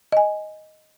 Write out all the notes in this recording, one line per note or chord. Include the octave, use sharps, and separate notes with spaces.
D#5 G#5